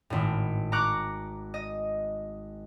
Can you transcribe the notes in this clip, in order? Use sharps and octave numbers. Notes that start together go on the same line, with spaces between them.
G#1 A2
A#5 C#6 D6 F#6
D#5